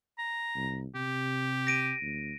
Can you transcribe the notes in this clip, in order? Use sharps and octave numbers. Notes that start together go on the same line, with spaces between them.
A#5
C2
C3 G4
A#6 D7 D#7
D2